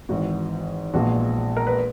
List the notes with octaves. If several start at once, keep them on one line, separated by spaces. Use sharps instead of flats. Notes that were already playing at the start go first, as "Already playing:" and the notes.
G#1 G#2 E3 F#4
A#1 A#2 G#3 B3 F#4
A#4
B4